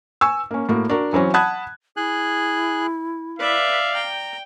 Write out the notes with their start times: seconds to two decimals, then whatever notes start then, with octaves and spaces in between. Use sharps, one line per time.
0.21 G#5 C#6 E6
0.51 A#3 C#4
0.69 A2 A#3 F#4
0.89 D4 F#4 A#4
1.13 E3 F#3 C4 C#4
1.34 F#5 A5 B5 D#6 F#6 G#6
1.97 E4 G#4 G#5 F#6
3.39 B4 D5 E5 F5 B5
3.95 G5 A#5